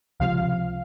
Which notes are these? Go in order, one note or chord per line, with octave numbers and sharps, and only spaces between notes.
C#2 C3 F3 F5